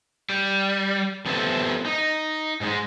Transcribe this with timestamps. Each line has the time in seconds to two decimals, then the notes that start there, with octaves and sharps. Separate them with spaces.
0.30 G3
1.26 F2 B3 G4 A4 C5 E5
1.86 D#4
2.61 G#2 G3 G#3